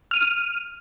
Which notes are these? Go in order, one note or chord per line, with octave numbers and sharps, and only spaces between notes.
F6 D#7